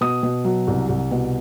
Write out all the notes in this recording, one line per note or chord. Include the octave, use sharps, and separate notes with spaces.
B2 D#6
B2
F#3
C2
C2
B2